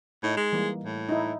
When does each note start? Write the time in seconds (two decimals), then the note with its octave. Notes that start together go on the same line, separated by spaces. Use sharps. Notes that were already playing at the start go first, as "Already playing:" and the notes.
0.24 A2 D#4
0.37 G#3
0.53 E3 G3 A#3
0.84 A2
1.09 D#4 E4